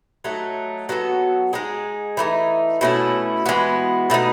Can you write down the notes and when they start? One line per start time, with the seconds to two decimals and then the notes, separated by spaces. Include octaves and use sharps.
0.24 F#3 A3 D#4
0.89 F#3 B3 F#4 A4
1.53 G#3 D#4 G#4
2.17 E3 A3 D#4
2.81 B2 A3 C#4 E4
3.46 E3 G#3 B3 F#4
4.10 B2 A3 D#4